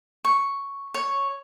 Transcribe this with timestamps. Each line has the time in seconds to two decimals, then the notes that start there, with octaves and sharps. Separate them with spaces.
0.25 C#6
0.94 C#5